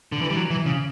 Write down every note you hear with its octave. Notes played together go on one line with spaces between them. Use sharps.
D3
E3
G3
F#3
E3
C#3